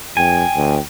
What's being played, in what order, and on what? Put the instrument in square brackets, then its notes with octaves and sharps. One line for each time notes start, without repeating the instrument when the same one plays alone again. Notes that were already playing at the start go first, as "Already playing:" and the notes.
[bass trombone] F2 [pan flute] G5 [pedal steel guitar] G#5
[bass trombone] D2